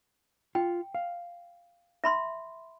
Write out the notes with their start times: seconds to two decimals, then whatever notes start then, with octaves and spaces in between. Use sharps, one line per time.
0.55 F4 G5
0.95 F5
2.04 E5 B5 C6